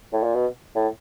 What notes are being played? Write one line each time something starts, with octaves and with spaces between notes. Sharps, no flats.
A2
A#2
B2
A2